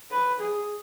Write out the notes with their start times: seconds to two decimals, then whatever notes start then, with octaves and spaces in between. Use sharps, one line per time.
0.11 B4
0.40 G#4